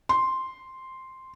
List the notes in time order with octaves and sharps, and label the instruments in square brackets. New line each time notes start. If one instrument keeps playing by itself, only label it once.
[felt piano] C6